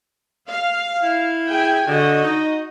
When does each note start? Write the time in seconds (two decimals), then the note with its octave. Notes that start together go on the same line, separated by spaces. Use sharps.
0.50 F5
1.02 E4
1.49 G#4 G5 G#5
1.88 D3 F#4 D#5
2.24 D#4